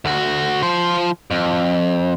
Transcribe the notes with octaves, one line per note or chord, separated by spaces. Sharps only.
D2 F#4
F3 C5
F2